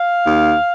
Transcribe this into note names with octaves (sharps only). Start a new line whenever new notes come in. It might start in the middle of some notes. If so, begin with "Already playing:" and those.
Already playing: F5
D#2